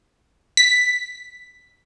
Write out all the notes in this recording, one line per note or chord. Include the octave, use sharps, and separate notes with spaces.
B6